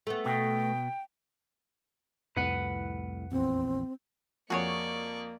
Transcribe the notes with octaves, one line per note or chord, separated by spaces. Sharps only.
A3 B3
B2 G5
C2 F2 A2 B4 F#5
A#1 E2 C4
F2 A#3 F#4 G#4 C#5 D5 C#6